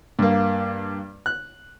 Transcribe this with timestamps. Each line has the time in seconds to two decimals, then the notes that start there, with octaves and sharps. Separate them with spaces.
0.19 G2 A#3
1.26 F#6